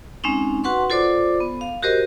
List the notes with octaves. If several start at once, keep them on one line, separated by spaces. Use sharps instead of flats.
G#3 C4 C#4 D#4
F#4 B4 F#5 C6 C#6
F4 A4 C5 D5 D6
B3
F5
F#4 G4 A#4 C5 D#5